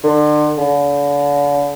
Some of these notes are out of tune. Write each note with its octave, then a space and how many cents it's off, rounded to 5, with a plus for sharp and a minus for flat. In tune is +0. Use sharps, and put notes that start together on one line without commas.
D3 +35
D3 -40